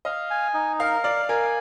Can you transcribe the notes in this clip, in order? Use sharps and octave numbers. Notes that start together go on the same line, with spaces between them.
D#5 F5
G#5
D#4
A#4 F5
D5 F5
A#4 G#5